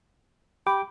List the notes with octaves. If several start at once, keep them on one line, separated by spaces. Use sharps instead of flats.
G4 G5 B5 D6